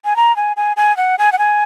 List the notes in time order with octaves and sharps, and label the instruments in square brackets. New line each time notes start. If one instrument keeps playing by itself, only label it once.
[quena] G#5
A#5
G#5
G#5
G#5
F#5
G#5
F#5
G#5